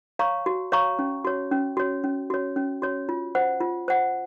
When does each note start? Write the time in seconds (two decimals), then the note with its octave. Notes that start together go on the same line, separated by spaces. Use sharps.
0.19 C#5 F5 A#5 C#6
0.46 F#4
0.72 C#5 F5 A#5 C#6
0.99 C#4
1.25 F#4 C#5
1.52 C#4
1.77 F#4 C#5
2.04 C#4
2.30 F#4 C#5
2.56 C#4
2.82 F#4 C#5
3.09 F4
3.35 C5 F#5
3.61 F4
3.88 C5 F#5